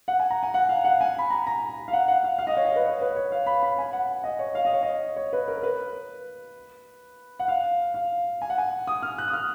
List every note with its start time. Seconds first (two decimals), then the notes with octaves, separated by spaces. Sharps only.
0.08 F#5
0.20 G#5
0.30 A#5
0.43 G#5
0.54 F#5
0.69 F5
0.84 F#5
1.01 G#5
1.18 B5
1.30 A#5
1.47 A#5
1.88 F5
1.93 F#5
2.08 F#5
2.24 F5
2.39 F5
2.47 D#5
2.57 C#5
2.65 D#5
2.76 B4
2.86 C#5
3.01 B4
3.16 C#5
3.32 F5
3.46 B5
3.63 B5
3.79 G#5
3.93 F#5
4.24 D#5
4.39 C#5
4.55 F5
4.65 D#5
4.73 C#5
4.83 D#5
5.16 C#5
5.33 B4
5.48 A#4
5.58 A#4
5.63 B4
7.39 F#5
7.48 F5
7.94 F5
8.42 G#5
8.50 F#5
8.58 G#5
8.87 D#6
9.03 F6
9.18 F#6
9.28 D#6
9.33 F6